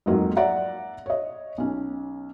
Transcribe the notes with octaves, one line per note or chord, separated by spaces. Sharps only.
F2 G#2 F#3 A#3
D5 E5 F#5 A#5
C#5 D#5
B1 C#4